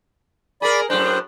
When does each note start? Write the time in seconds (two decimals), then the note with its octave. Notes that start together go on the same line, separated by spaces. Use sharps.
0.62 G#4 A#4 D5 B5
0.90 F#2 A2 D4 C5